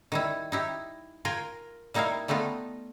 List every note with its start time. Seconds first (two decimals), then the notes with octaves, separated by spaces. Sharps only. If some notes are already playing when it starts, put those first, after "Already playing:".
0.12 D#3 G3 E4
0.52 D#4 E4 G4
1.25 F4 A#4 G5 G#5
1.94 G3 A#3 D#4 E4 A#4 F5
2.28 G3 A3 B3 D#4 F4